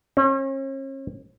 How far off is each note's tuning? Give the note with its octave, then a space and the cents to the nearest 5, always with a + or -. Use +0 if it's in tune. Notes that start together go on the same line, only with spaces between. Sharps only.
C#4 -40